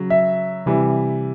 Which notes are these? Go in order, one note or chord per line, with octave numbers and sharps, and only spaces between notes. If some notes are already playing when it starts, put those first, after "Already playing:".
Already playing: C#3 F#3
E5
C3 E3 G3